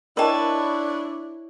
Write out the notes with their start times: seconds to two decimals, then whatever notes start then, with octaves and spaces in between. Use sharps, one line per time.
0.17 D4 E4 A#4 B4 C#5 D#5 G5 A5